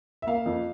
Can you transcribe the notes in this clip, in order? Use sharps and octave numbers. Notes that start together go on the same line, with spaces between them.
E5
A#3 F5
F2